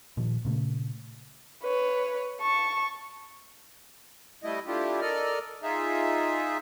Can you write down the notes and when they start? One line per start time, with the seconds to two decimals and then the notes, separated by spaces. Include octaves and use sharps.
0.17 A#2 D#3 F3
0.45 A#2 C#3 A3
1.63 B4 C#5
2.41 A5 C#6
4.43 G3 A3 E4 D#5
4.67 A3 D4 E4 F4 G4
5.01 A4 A#4 D5 D#5 F6
5.63 D#4 F4 G#4 E5